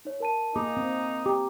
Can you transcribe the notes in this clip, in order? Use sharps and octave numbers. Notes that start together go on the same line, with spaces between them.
D#4 C#5
A#4 A5 D#7
A#3 D#4 G#4 D6
C4
G4 A#5 D6